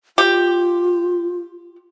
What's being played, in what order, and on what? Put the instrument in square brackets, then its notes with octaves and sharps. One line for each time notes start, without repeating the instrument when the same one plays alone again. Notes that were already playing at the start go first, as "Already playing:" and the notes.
[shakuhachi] F4 [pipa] G4